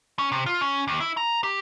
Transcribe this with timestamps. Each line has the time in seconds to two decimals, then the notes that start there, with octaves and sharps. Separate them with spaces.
0.19 C#4
0.32 C3
0.46 F4
0.61 C#4
0.88 D#2
1.00 E4
1.17 A#5
1.44 G4